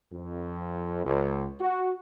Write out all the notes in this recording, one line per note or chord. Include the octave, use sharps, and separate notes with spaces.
F2
C#2
F#4